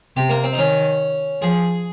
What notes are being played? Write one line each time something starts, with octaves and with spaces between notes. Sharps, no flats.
C3 G4
A#3
C4
D#4
D#3 C#4
F3 G#4